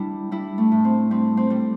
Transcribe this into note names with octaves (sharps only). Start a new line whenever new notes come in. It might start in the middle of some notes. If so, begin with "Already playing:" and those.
Already playing: G3 D4 E4
G3 E4
A3
A2
C4
G3 C4
C4
G3